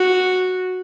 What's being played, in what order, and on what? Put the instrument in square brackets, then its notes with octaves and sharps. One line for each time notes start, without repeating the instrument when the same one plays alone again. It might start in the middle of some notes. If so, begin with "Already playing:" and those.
Already playing: [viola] F#4